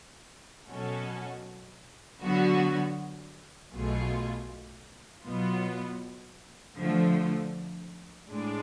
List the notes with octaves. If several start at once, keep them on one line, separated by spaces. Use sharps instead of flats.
B2 F#3 C#4 F#4 A4
D3 F#3 B3 F#4
B1 B2 A3 F4 G#4
B2 F#3 B3 F4
D3 F3 A3
A2 G#3 D4 G#4